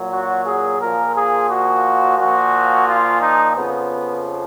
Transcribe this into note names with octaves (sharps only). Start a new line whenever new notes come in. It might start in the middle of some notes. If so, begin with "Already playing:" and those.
Already playing: A#2 F#3
F#4
G#4
A#2 F3 A#4
G#4
F#4
A#2 F3 F#4
F4
D#4
F2 C#3 F3 B3